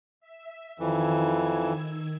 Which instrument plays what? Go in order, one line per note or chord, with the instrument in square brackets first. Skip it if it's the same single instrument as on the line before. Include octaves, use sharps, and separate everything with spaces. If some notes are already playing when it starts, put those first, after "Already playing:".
[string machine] E5
[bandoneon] F2 E3 [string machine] D#3 E6 G#6